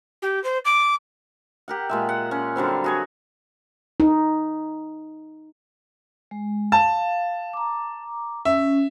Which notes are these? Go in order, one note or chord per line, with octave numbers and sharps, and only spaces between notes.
G4
C5
D6
G4 A#4 F#5
A#2 G#3 E5
F#5
C#4
D3 F#3 G3 C4
F#4 G#4 C#5
D#4
G#3
F5 A5
A#5 D6
C#4 E5